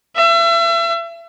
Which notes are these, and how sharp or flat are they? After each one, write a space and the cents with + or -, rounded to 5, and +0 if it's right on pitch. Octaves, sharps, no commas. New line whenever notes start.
E5 +35